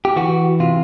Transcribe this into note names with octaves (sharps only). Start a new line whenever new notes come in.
G4
E3 F#4
C3 F4